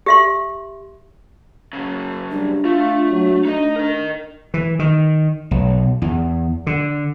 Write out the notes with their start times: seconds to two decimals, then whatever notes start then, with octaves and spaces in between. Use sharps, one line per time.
0.06 G4 E5 C6
1.73 F#2 C#3
2.31 G3 D4
2.65 A3 F4
3.11 F#3
3.45 A3 D#4 D#5
3.76 A#4 D#5
4.54 E3
4.79 D#3
5.51 B1
6.02 E2
6.67 D3